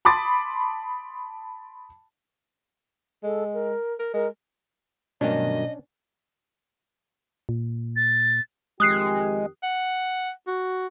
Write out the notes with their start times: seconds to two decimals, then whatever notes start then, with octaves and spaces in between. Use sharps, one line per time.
0.05 A5 B5 C6 D6 D#6 A6
3.23 G#3 A4
3.54 A#4
3.99 A#4
4.14 G#3 A#4
5.21 D2 G2 B2 D#3 F#3 C#4 D4 D#5
7.49 A#2
7.96 A6
8.80 F2 D#3 G#3 G4 D#6 F#6 C7
9.63 F#5
10.47 F#4